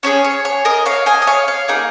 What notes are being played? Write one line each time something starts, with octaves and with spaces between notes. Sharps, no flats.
C#4 F4 G#4 C#5
C#5
C#5
A#4 D#5
C#5 F5
D#5 G#5
D#5
C#5 F5
C#5 F5
A#3 D#4 G#4 F5